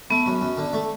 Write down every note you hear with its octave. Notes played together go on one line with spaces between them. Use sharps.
A3 B3
F#2
F#2
D3
A3